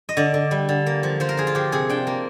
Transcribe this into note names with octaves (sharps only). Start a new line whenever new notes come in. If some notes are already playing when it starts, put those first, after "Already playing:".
D#5
D3 D5
D3
G3
D3
A#3
F3
F3 C5
A#4
F3 G#4
F4
F3 G4
C3 G#4
D4 G5
A#3